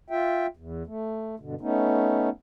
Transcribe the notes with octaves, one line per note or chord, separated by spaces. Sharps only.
F4 E5 G5
E2
A3
G2 B2 D3
A3 B3 C#4 D#4